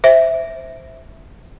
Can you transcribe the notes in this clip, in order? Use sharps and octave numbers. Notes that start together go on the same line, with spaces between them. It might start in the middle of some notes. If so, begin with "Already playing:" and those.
C5 E5